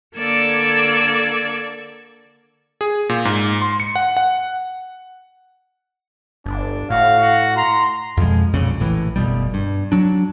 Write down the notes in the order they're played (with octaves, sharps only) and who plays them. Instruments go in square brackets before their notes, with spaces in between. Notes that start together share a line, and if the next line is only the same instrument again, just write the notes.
[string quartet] D3 A#3 A4 D5 E6 G#6
[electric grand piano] G#4
A#2
G#2
C6
C#7
F#5
F#5
[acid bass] G1 [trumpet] D4
[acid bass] A2 [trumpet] F#4 [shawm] F5
[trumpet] F#4
[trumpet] A#5 [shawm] C6
[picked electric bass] F2 B2 F3 G#3
B1 F2 A#2 C#3
A#1 A2 E3
F#1 D#2 B2 G3
G2
F#3 D4